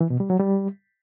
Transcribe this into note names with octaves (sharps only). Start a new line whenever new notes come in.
E3
B2
G3
F#3
G3